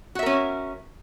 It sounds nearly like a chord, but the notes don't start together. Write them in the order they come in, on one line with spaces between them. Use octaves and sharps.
F#4 E5 A#4 C#4